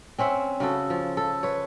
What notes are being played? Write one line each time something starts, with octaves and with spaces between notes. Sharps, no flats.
C4 C#4 E5 F#5
C#3 F#4 A4
F3
A4
B4 C#5